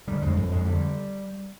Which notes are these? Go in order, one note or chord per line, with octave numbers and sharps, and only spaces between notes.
D3 G3
F2 G#3
F2
F2 G#3
D3 G3